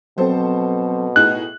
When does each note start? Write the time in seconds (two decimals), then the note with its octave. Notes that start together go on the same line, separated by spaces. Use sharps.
0.18 B2 F#3 C4 A4 C5
1.16 A2 D#4 G#4 F#6